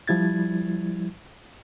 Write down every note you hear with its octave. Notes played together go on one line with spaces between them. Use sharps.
F3 G3 E4 G#6 A6